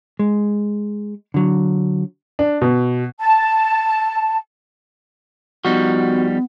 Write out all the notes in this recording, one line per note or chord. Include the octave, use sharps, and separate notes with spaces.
G#3
D3 F#3
D4
B2
A5
F3 G3 B3 D#4 F#4